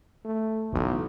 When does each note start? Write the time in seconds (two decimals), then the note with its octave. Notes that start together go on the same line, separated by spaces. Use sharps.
0.25 A3
0.72 B1 C#3 E3